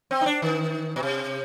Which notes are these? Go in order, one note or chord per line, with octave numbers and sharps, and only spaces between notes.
C4
D#4
D4
D#3
B2
C3